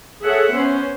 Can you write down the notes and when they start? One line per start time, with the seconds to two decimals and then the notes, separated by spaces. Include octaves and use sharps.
0.24 G#4 A4 C#5 E5 F#5
0.55 B3 C#4 C5